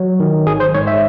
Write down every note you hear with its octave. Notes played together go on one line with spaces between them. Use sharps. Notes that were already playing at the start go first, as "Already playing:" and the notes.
Already playing: F#3
D#3
G#1 G#4
C5
G#2 C#5
E5